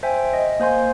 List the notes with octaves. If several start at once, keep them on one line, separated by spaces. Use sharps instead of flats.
C5 E5 G5 G#5
D#5
A#3 C5 G#5 C6 G6